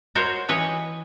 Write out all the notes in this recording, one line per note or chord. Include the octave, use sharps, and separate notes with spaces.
F#4 A#4 C5 C#5
E3 B4 C#5 D#5